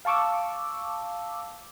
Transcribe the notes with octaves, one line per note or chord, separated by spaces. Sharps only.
F5 A5 C#6 D6 E6